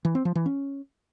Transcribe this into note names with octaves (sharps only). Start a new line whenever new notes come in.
E3
C4
F3
E3
C#4